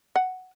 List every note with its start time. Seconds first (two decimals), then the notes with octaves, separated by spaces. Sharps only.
0.16 F#5